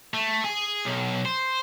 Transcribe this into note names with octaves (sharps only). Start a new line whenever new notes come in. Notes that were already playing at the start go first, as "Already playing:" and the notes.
A3
G#4
B1
C5